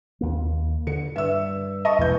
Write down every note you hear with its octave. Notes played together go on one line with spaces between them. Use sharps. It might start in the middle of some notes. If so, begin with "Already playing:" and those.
D#2 A#3
D3 C#7
G2 E5 E6
D#5 A5 C#6
E2 B2 E3 G#3 G6